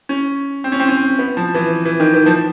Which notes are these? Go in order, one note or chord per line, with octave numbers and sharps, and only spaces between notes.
C#4
C4
C#4
C4
C#4
C4
B3
F3
E3
E3
D#3
E3
F3